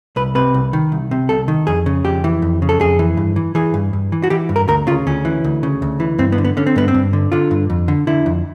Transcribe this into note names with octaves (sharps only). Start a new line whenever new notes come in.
C2 B4
C3 B4
C2
D#3
C2
C3
C2 A4
D#3
F2 G#4
C#3
F2 G4
E3
F2
C#3
A4
F2 G#4
E3
G2
E3
E3 G#4
G2
G2
E3
F#4
E3 G4
G2
A#4
D2 A#4
C#3 F4
D2 C#4
E3
D2
C#3
D2
E3
G2 C4
B3
D3
B3
D3 C#4
C4
G2 B3
C4
G2
D3
D3 F4
G2
F2
D3
D3 E4
F2